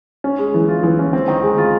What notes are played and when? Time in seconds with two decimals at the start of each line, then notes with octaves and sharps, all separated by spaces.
0.24 C#4
0.39 G#3
0.54 E3
0.68 F4
0.83 E3
0.99 C#4
1.13 C4
1.28 D#3
1.43 G#3
1.58 F4